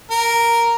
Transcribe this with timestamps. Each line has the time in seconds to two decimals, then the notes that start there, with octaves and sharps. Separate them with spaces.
0.11 A#4